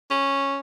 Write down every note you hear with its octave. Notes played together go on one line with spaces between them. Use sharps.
C#4